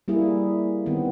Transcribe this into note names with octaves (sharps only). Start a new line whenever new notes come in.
G3 A#3 E4 G#4
D#3 B3 C4